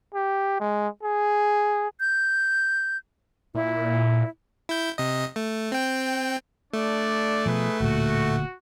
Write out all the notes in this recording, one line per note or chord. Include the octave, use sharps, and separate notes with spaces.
G4
G#3
G#4
G6
A#2 E4
E4 G6
C3 D#5
A3
C4 G5
A3 D4 D5
B2 F3 D#4 G#4 B4
D1 D2 A#2 F#4